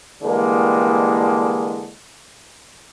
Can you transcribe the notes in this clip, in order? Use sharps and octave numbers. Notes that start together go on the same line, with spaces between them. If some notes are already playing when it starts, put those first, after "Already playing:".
D3 E3 G3 G#3 A#3